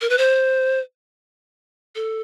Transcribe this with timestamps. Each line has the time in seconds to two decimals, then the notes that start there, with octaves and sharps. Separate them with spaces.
0.01 A#4
0.10 B4
0.18 C5
1.95 A4